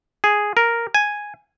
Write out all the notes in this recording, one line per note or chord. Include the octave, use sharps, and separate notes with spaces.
G#4
A#4
G#5